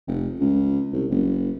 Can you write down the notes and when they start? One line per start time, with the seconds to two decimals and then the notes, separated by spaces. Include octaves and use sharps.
0.08 F1
0.40 C#2
0.93 C2
1.11 F#1